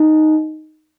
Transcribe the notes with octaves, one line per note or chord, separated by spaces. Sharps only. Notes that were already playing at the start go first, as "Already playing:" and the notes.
Already playing: D#4